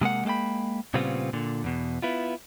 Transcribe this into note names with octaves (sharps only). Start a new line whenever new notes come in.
C3 G#3 A#3 F#5
G#3 A#3 F5 G5 B5
A#2 C#3 G3 B3 C4 F4
A#2 D3
E2 B2
B3 E4 F4